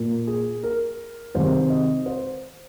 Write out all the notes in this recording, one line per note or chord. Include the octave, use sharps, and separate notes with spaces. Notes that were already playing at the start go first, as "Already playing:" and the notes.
Already playing: A#2 A#3
G#4
A#4
C3 D#3 G#3 C5
D#5
C5